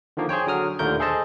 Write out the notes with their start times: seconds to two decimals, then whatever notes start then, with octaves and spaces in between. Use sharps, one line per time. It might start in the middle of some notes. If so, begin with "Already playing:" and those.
0.17 D3 D#3 F3 A#3
0.29 G#4 C5 C#5 G5
0.47 D3 F#3 D#6 F6
0.79 D#2 A#2 D3 A3 A#4 G6
1.00 G#4 A4 C5 D#5 A5